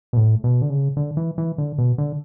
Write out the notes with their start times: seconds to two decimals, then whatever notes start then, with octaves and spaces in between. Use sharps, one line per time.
0.13 B2
0.16 A2
0.44 B2
0.62 D3
0.70 C#3
0.97 D3
1.17 E3
1.38 E3
1.58 D3
1.78 B2
1.98 D3